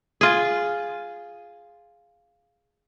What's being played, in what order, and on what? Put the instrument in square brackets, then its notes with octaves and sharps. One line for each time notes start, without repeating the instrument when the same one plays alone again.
[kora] F4 G#4